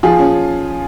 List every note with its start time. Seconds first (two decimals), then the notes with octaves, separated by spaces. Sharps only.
0.03 F3 F4 G#4
0.19 C#4